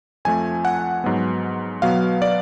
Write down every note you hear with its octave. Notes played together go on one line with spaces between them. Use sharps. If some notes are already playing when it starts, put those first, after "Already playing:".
F2 F3 A3 G#5
F#5
G#2 F#3 B3
B2 F#3 B3 F5
D5